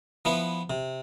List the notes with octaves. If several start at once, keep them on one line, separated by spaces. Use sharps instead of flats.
F3 B3 E4 B4
C3